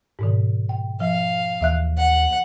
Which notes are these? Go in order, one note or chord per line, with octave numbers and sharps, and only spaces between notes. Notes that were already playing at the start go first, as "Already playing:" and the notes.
G#2 B2 D#3
G5
F3 F5
D#2 E3 E5 F#6
F#5